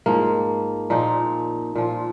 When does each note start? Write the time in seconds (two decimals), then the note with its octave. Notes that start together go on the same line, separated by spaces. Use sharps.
0.06 G#2 F3 A#3
0.90 A#2 F3 D#4
1.76 A#2 F3